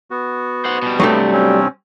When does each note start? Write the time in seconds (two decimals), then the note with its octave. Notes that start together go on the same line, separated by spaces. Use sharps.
0.11 B3 F#4
0.65 C5 F#5
0.82 B2 G3
1.00 G2 C3 F#3 G3 A3
1.33 C4 C#4